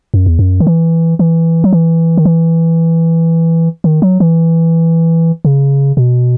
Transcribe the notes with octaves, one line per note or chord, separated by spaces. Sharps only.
F#2
E2
F#2
D#3
E3
E3
F#3
E3
D#3
E3
D#3
F#3
E3
C#3
B2